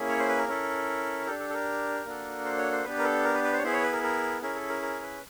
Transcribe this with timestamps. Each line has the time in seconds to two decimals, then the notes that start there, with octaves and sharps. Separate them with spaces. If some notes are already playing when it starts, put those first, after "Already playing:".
Already playing: A#3 C#4 E4 G#4
0.09 C#5
0.19 C5
0.29 B4
0.38 A#4
0.48 C#4 E4 A4
1.26 D4 G4 A4
1.40 A4
1.50 A4
1.54 A#4
2.05 A#3 D4 F#4 A4
2.45 C5
2.58 C#5
2.72 C5
2.84 B3 D4 G4 B4
2.98 A#4
3.04 A4
3.24 A#4
3.34 B4
3.44 B4
3.53 C5
3.58 C#5
3.63 B3 E4 G#4 C5
3.73 C#5
3.83 B4
3.93 A#4
4.03 A#4
4.42 C#4 E4 G#4 A#4
4.56 A4
4.69 A#4
4.82 A#4
5.02 B4